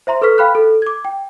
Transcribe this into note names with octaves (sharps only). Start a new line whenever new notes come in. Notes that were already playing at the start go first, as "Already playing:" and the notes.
C5 E5 A#5 C6
A4 B4 C#6 F6 B6
F5 G5 B5 F6 F#6
A4
D6 G#6
G5